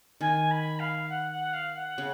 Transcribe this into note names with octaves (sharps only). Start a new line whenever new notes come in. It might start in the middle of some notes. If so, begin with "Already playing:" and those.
D#3 G#5
B5
F5
F#5
F#5
F5
F#5
C#3